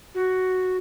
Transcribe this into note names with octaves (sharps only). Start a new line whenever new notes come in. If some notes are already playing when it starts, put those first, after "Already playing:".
F#4